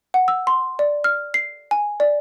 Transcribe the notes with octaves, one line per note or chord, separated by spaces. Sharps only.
F#5
E6
C6
D5
F6
C7
G#5
D5